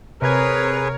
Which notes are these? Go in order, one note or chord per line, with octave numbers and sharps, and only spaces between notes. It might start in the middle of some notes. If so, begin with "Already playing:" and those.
C3 G#4 A#4 B4 C#5 A#5 G#6